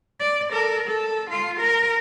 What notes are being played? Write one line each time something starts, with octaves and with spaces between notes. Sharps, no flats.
D5
A4 A#4
A4
F4
A#4